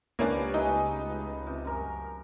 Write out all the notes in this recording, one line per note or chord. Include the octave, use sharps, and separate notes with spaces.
C#2 A#3 B3 C#4 D4 G4
A3 D#4 G#4 B4
C3
F#2 A#4